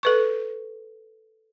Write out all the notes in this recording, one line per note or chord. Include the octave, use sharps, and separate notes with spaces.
A4 B4 C#6